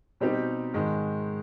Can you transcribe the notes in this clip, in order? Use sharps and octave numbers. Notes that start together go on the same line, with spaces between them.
B2 G3 C4 D#4 G4
G#2 D#3 G#3